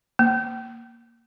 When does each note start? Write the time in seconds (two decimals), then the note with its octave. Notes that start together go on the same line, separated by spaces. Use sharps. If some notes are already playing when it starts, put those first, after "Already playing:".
0.19 A#3